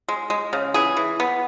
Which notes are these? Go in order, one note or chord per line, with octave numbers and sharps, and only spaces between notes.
G#3
G#3
C#3
E3 G#4
E3
B3